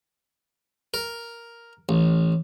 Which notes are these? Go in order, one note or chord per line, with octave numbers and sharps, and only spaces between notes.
A#4
A1